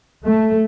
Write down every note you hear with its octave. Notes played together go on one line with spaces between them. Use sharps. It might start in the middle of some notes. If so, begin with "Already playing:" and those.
A3